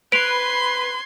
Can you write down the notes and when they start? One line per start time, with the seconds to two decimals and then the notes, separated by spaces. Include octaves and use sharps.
0.12 B4 C6 G#6 D7 F7